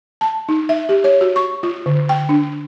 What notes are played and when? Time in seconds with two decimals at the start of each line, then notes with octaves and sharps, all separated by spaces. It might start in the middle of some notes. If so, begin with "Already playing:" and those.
0.21 A5
0.49 D#4
0.69 E5
0.89 G4
1.04 C#5
1.21 F#4
1.36 C#6
1.63 F4
1.86 D3
2.09 G5
2.29 D4